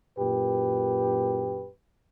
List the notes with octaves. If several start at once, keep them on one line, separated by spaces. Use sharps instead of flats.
F#2 A#2 G4 B4